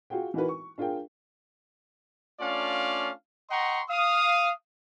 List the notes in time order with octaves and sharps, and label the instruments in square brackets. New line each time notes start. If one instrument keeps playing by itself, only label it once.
[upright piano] F4 F#4 G#4 G5
E3 D#4 E4 F#4 A#4 B4
C#6
D4 F4 G#4 A#4 G5
[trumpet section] A3 C#4 D4 F4 D5 F5
D#5 F#5 G5 A#5 C6 C#6
F5 D#6